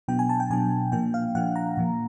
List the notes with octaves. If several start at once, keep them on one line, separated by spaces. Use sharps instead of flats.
B2 F#3 B3 D4 G5
G#5
A5
G5
B2 F#3 B3 D4 G#5
A#2 F3 A#3 D4 G5
F5
A#2 F3 A#3 D4 F#5
A#5
A#2 F3 A#3